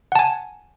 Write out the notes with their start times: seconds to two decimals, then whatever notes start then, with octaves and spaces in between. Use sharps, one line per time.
0.12 F#5
0.15 A5
0.19 G#5